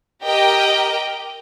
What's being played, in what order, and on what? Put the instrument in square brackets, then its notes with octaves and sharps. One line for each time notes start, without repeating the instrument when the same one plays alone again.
[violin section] G4 A#4 D#5 G5